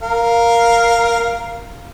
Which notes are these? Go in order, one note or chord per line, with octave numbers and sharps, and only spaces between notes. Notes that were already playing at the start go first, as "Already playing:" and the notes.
A#4 F5